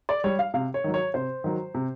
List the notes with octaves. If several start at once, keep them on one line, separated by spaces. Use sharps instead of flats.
D5
G3 C#5
F5
C3 F5
C#5
D#3 F#3
C#5
C3 C5
D#3 F#3
C3